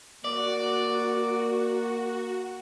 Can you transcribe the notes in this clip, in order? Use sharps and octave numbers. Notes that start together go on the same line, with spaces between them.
A#3 F#4 D5